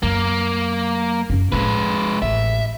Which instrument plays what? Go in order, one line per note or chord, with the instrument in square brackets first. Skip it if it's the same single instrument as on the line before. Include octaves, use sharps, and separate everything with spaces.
[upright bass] F#2 F#3 [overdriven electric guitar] A#3
[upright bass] F#2 C#4
[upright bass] A2 F3 [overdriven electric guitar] G#3 B4
[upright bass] A1 [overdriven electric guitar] E5